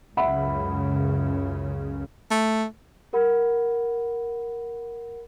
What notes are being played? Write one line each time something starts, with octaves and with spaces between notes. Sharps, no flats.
C#2 F#2 C#3 E5 F#5 B5
A3
G4 A#4 F#5 B5